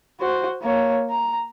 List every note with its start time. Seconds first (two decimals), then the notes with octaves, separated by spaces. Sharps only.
0.20 F#4 C5
0.62 A#3 C#5
1.10 A#5